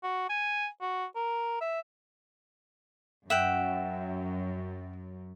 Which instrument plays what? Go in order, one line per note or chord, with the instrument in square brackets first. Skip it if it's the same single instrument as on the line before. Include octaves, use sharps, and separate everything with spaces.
[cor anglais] F#4
G#5
F#4
A#4
E5
[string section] F#2 [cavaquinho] E5 F#5 G5